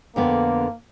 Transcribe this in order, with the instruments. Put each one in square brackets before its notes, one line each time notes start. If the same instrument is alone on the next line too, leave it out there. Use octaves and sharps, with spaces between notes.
[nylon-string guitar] F2 D3 B3 [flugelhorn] A#3